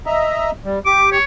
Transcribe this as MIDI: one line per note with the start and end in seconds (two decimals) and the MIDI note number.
0.06 0.51 75
0.06 0.51 76
0.06 0.51 82
0.65 0.79 55
0.86 1.18 67
0.86 1.10 86
1.12 1.24 73